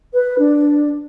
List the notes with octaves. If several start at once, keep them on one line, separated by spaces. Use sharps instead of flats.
B4
D4